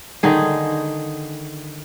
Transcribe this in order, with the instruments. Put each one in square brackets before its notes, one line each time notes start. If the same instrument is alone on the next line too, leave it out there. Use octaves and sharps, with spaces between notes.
[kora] D3 D#3 D#4 G#4